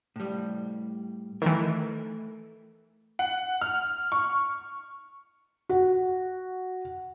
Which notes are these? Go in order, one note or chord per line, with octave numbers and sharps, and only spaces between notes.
A2 G3
D#3 E3 A3 A#4
F#5
F6
C#6
F#4